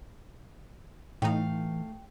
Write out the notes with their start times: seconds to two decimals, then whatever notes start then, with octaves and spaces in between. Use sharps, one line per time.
1.22 A2 E3 A3 D#4 F5 G5